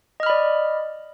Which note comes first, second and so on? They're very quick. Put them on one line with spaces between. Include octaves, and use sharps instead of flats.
D#5 F6 B5 D5